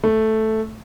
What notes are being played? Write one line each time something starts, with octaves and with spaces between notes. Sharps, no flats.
A3